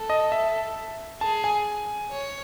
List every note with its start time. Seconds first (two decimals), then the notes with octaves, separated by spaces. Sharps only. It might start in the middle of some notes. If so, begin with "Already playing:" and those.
Already playing: A4
0.10 D#5
0.32 E5
1.21 G#4 A5
1.44 G#5
2.11 C#5